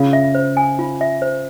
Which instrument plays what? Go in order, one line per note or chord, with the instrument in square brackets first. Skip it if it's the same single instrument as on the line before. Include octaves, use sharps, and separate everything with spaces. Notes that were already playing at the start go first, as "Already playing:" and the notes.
Already playing: [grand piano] C#3 [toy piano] F4
[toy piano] E5
C5
G#5
F4
E5
C5